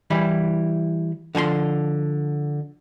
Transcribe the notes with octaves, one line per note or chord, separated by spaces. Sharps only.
E3 G3 E4
D3 F3 G#5 C6